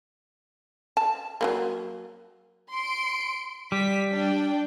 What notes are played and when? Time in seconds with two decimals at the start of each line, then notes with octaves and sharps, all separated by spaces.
0.97 A5
1.41 F#3 A3 A#3
2.73 C6 D7
3.72 G3 B6
4.10 D4 G5